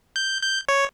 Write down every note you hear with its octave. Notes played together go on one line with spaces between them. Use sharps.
G6
G6
C#5